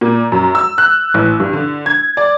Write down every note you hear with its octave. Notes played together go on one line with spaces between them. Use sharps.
A#2
F#2
E6
F#6
A1
G2
D3
G#6
D5